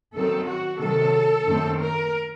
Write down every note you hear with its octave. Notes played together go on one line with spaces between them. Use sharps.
F#2 D#3 F#3 C4 A4
F#4
C3 D#3 F#3 A4
F#2 D#3 A3 C4
A#4